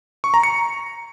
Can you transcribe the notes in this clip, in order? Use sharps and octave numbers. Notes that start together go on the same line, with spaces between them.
C#6
A#5
C#7